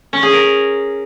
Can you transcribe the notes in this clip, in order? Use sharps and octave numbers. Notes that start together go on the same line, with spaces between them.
C#4
G#4
A#4